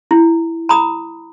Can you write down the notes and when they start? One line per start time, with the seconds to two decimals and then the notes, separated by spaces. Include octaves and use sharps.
0.11 E4
0.69 A#5 B5 D#6